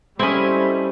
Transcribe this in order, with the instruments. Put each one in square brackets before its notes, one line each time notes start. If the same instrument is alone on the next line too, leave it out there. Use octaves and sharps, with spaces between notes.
[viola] G3 A4 [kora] C4 C#4 [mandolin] E4 D#5 [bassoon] C5